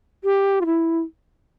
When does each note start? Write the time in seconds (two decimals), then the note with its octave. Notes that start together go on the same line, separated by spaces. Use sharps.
0.24 G4
0.61 F4
0.66 E4